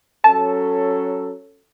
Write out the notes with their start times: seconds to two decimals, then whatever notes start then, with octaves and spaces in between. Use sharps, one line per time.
0.24 F#3 C#4 A4 A5